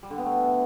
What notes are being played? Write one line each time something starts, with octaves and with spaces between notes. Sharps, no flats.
G3
D3
B3
A3